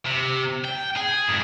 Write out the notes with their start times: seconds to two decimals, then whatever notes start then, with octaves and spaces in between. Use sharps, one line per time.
0.06 C3
0.65 G5
0.96 G#4
1.29 F2 G#2